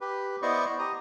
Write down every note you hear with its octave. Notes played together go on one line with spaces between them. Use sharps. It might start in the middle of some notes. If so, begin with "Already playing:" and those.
G4 B4
B3 E4 C5 D5 D#5 C#6
G4 A#5 D#6